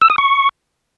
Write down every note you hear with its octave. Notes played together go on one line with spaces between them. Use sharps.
E6
D#6
C#6